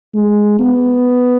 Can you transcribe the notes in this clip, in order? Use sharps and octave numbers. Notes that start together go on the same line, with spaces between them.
G#3
B3